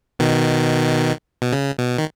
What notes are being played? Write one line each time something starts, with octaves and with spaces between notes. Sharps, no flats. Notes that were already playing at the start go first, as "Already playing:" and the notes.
B2 D#3
B2
C#3
B2
D#3